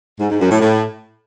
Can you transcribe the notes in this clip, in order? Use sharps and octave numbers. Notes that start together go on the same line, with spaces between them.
G#2
G#2
F#2
A2
A2